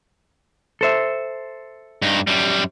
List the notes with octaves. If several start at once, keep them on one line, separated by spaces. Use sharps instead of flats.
A4 C5 E5
G2 D#4
F#2 G3